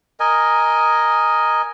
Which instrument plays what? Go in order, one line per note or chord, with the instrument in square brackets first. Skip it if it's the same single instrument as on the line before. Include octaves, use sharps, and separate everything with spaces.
[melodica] A#4 D#5 G#5